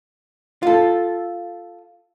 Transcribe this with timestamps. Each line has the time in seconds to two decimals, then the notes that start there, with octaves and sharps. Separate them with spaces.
0.63 F4 A4